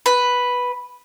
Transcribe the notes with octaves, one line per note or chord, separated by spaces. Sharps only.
B4